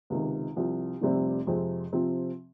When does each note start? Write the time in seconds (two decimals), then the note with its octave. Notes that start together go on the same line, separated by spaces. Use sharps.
0.10 C#2 C3 D#3
0.56 C2 C3 F3
1.01 F1 F2 C3 G3 C4
1.47 F2 C3 F3 G#3 C4
1.93 C3 F3 C4